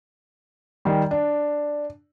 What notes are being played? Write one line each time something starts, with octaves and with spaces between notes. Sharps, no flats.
D#3 G3
D4